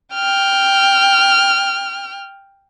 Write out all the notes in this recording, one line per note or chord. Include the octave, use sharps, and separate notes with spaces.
G5 F6